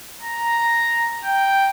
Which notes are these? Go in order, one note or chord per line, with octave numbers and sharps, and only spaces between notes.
A#5
G5